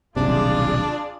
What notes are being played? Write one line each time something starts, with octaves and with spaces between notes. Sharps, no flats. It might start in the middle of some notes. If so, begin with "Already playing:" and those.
D#1 B1 C3 D4 F4 G#4 D5